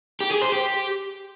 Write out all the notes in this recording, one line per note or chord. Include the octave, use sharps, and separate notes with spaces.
G4
G#4
C5
G4